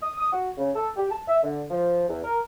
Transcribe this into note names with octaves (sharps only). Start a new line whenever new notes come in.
D#6
D#6
F#4
C#3
A4
G4
A5
E5
D3
F3
E2
A#4